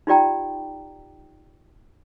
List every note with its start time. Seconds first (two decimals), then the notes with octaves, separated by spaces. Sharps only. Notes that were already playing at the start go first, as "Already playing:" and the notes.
0.07 D#4 F4 G4 D5 G5 A#5